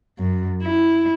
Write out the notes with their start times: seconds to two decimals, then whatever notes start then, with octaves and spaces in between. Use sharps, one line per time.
0.19 F#2
0.63 E4